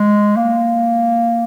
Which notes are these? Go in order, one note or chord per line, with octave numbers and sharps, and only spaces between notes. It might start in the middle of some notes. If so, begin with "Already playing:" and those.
Already playing: G#3
A#3